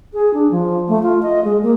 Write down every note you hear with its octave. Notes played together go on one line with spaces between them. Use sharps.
G#4
D4
F3
A3
F4
D#5
G#3
A#3